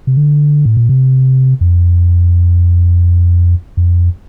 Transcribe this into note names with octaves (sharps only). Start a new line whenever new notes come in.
C3
D3
A2
A#2
C3
F2
F2